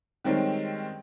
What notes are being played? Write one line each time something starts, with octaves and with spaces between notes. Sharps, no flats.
D#3 G3 G#3 C4 C#4